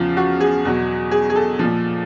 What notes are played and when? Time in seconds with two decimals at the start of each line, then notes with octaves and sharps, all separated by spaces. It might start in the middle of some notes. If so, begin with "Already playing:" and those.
Already playing: E2 C#3 F3 F4
0.17 F#4
0.40 G#4
0.65 E2 B2 F#3
1.11 G#4
1.30 G#4
1.36 A4
1.59 A#2 F3